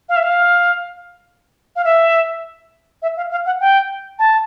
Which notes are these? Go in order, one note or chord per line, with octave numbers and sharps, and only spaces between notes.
F5
E5
F5
F5
E5
E5
F5
F5
F#5
G5
A5